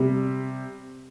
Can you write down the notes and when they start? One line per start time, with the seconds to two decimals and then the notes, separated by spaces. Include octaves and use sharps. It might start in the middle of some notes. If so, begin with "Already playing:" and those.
Already playing: C3 G3